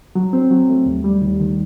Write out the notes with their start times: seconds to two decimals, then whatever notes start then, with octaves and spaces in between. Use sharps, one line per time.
0.15 F#3
0.33 C4
0.50 F#3
0.69 A3
0.86 D#2
1.04 G3
1.22 D#2
1.40 D#3